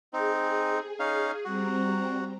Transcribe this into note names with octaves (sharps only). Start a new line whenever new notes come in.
C4 D#4 G#4
C#4 D#4 F5
G3 C4 F#4 A#5